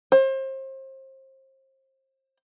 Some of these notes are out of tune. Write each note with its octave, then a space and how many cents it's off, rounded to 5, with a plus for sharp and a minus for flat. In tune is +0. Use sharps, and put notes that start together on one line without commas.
C5 +30